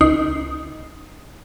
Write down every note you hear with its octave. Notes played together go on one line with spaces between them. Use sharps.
C#2 D#4 C7